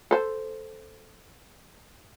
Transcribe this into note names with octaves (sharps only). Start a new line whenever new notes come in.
A4 C5